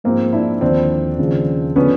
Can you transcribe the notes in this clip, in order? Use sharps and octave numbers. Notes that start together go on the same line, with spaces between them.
G#2 F3 A#3 C4
D4 E4
D#2 D3 F3 C4 D4
D#2 C#3 F3
D3 F3 B3 C#4